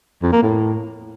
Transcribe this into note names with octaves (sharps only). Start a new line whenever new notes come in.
F2
A#3
A2